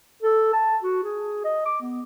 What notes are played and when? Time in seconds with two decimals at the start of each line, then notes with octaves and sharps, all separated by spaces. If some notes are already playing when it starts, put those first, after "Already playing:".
0.22 A4
0.53 A5
0.82 F#4
1.03 G#4
1.44 D#5
1.65 D6
1.81 B3